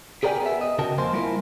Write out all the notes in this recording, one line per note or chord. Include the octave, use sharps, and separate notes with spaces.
G4 G#4 A#4 D5 G5 G#5
B3 E5
D#5
C#3 F#4 A#4 D#5 G5 A5
F2 A#3 C5 G#5 C6
G3 A#3 C4 E4 F4 A#4